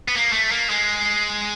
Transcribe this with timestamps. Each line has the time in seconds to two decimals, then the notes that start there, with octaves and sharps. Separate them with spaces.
0.08 B3
0.15 A#3
0.32 A3
0.52 A#3
0.70 G#3